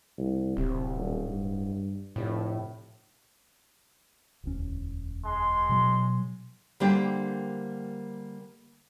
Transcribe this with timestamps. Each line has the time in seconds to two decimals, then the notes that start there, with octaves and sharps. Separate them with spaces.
0.18 C2
0.57 D1 C3
0.97 D#1
1.28 G2
2.16 F1 A2
4.44 E1 D2 C#4
5.25 G#3 C6
5.69 B2 F#3
6.80 D3 G3 A#3 D4 G4 C5